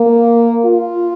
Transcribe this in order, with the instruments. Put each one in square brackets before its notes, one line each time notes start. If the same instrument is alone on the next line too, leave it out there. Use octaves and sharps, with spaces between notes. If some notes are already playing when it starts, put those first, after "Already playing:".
Already playing: [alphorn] A#3
F4